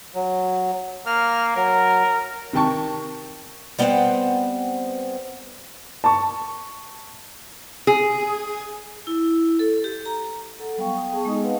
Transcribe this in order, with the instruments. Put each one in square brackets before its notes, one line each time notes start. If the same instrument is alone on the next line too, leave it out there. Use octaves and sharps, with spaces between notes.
[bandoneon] F#3
[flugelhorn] A#3 [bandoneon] F6
[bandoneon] F#3 [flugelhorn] A#4
[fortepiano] C3 D#3 G5 A5 C#6
[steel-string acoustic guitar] G3 B3 C4 B4 C5 F#5
[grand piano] A5 C#6
[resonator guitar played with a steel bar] G#4
[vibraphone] E4
A4
G4
A#5
A4 F#5
F#3 G3 B3 F5 G5 C#6
F5 G5 D#6
B3 G#4 A5 C#6
G#3 B3 D#4 D#5 D#6
C4 B4 D#5 F5 F#5